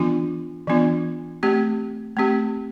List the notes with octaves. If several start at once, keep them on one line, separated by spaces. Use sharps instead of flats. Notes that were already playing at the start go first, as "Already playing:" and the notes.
Already playing: E3 B3 D4 F4
E3 B3 D4 F4
A3 C4 G4
A3 C4 G4